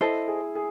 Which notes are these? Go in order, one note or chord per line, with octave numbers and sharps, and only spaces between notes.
E4 A4 C5 D#5
G#4
G#4